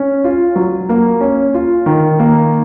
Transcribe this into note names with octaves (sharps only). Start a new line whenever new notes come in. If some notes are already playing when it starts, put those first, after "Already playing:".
Already playing: C#4
F4
F#3
A#3
C#4
F4
D#3
A#3